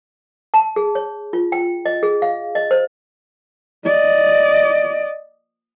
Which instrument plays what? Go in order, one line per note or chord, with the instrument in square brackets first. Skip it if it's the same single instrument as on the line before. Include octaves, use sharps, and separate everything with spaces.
[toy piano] A5
G#4
C#5
F4
G5
D#5
G#4
F5
D#5
C5
[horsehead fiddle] D5 D#5